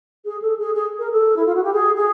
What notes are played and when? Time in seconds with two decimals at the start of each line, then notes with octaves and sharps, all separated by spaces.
0.24 G#4
0.41 A4
0.58 G#4
0.74 G#4
0.98 A#4
1.11 A4
1.36 E4
1.45 F4
1.54 F#4
1.63 G4
1.72 G#4
1.96 G#4